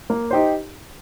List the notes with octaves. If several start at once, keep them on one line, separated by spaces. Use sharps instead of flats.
A#3
D#4 G4 C5